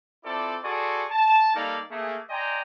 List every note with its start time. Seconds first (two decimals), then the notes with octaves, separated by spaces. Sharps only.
0.24 C4 E4 F4 A4 D5
0.64 F#4 G#4 A4 D5 C6 C#6
1.10 A5
1.55 G3 A#3 D#4 A4 D5 F5
1.91 A3 A#3 G#4
2.30 D5 D#5 G5 G#5 A#5 C6